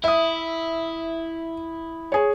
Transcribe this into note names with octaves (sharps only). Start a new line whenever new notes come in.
E4 E5 D#6
G#4 C#5